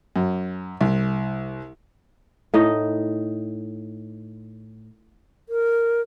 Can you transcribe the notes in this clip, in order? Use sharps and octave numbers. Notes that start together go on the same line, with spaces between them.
F#2
C2
A2 D#4 D#5
A#4